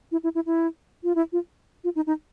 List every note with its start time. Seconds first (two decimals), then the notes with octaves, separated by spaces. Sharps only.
0.12 E4
0.24 E4
0.35 E4
0.46 E4
1.04 F4
1.15 E4
1.33 F4
1.84 F4
1.96 D#4
2.07 D#4